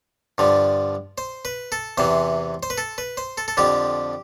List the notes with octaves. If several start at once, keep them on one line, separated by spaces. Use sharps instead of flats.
G2 D3 F3
C5
B4
A4
E2 C3 E3 C5
C5
B4
A4
B4
C5
A4
A4
F2 D3 F3 G4